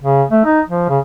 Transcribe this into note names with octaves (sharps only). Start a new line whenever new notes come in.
C#3
A3
D#4
F3
C#3